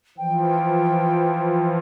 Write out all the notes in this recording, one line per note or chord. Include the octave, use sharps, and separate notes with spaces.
E3 F3 G5